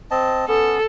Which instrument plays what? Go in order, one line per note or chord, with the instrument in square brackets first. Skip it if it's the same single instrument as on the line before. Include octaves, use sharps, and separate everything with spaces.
[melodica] C4 D#5 A5
[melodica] B3 C#4 [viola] A4